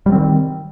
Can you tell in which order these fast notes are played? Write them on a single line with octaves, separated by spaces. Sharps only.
G3 F3 C4 D#3